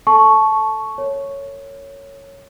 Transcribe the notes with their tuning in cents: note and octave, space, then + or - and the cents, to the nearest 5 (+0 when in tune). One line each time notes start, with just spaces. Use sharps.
A4 +0 A5 -20 C#6 +0
A#4 -45 C#5 +0